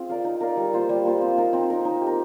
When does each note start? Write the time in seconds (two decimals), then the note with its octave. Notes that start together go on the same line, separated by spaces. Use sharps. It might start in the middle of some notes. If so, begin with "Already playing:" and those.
Already playing: C4 F4 G#4
0.09 A#4 D5 F5
0.24 D#4
0.41 A#4 D5 F5
0.57 G3
0.73 A#3 F4 C5
0.89 G3
1.05 A#3 F4 C5
1.21 C4
1.37 D#4 A#4
1.53 C4
1.70 D#4 A#4
1.85 D#4
2.02 G4
2.07 A#4